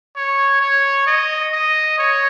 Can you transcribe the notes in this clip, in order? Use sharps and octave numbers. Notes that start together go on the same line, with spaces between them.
C#5
C#5
D#5
D#5
C#5